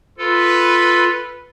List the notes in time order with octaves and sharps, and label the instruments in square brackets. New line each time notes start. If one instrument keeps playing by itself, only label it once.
[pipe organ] F4 A4 [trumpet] B4